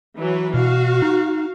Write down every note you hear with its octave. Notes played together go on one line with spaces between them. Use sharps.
E3 F#3 B4
B2 F#4 F5
D#4